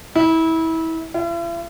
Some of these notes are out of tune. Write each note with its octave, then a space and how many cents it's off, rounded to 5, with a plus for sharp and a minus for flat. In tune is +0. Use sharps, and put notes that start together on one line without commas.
E4 -25
E4 +45